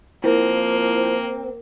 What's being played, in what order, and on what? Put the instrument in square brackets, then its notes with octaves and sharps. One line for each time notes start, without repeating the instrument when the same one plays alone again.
[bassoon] F3 [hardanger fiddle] A#3 [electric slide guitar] C4 [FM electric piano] E4 A#4